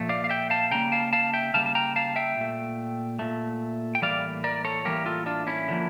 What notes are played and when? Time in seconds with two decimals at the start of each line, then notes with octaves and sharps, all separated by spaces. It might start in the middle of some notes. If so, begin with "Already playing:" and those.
Already playing: A#2 F3 A3
0.09 D5 F5
0.24 F5
0.29 E5 G5
0.50 F5 A5
0.71 C#3 G3 A#3 G5 A#5
0.92 F5 A5
1.13 F5 A5
1.33 E5 G5
1.54 C#3 G3 A#3 F5 A5
1.66 A5
1.75 G5 A#5
1.96 F5 A5
2.16 E5 G5
2.37 A#2 A3
3.19 A#2 A3
3.95 G5
4.02 A2 E3 G3 A#3 D5 F5
4.44 A#4 D5
4.65 A4 C#5
4.85 A2 E3 G3 A#3 G4 A#4
5.06 F4 A4
5.26 D4 F4
5.47 C#4 E4
5.68 D3 F3 A#3